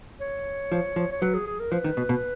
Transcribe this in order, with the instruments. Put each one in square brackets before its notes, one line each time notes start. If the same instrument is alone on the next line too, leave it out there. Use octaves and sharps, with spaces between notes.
[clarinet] C#5
[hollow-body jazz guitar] F3
F3
[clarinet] C#5
[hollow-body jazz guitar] F#3 [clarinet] B4
[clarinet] G#4
G#4
A#4
[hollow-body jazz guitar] F3 [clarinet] B4
[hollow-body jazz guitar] D#3
B2
B2